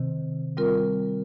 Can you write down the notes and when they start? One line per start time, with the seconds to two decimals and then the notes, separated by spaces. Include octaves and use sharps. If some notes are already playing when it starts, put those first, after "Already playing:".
Already playing: C3 D#3 C4
0.57 G3 C4 F4 A#4